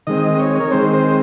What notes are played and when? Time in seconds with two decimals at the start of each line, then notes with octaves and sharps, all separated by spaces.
0.07 D#3 G#3 C4 D#5
0.40 C#5
0.60 A#4
0.71 D#3 G#3 C4 C5
0.93 C5